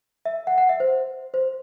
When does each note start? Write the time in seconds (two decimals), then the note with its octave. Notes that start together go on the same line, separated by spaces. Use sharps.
0.25 E5
0.47 F#5
0.58 F#5
0.69 E5
0.80 C5
1.34 C5